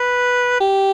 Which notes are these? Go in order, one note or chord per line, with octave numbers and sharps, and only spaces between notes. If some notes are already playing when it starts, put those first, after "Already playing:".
Already playing: B4
G4